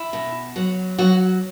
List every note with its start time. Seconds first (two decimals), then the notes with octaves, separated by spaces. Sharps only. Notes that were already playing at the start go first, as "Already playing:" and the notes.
Already playing: E4
0.13 B2
0.56 F#3 F#4
0.99 F#3 F#4